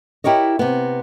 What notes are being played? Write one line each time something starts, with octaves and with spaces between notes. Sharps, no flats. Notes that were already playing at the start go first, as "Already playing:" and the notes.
E4 G4 A#4 C#5 D#5
C3 B3